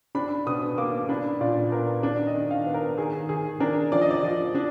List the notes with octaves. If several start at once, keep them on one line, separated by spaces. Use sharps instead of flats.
D4 B5
B2 D#6
A#3 D6
D4 B5
A#2 D5
B3 A#4
D4 D5
D#5
D#3
F5
B3
A#4
D#3 G#4
D#3 G#4
D4 A#4
F3 D5
D#5
D5
F3
D4